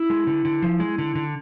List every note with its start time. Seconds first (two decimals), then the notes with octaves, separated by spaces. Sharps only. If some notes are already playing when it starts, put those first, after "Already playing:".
Already playing: E4
0.10 G#3
0.27 D3
0.45 D3
0.62 F3
0.80 G#3
0.98 D3
1.15 D3